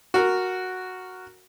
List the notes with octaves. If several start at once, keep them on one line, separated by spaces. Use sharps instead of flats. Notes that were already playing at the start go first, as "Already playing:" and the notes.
F#4 A#4